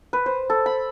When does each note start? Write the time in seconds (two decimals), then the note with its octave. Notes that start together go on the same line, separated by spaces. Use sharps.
0.13 B4
0.26 C5
0.50 A4
0.66 B5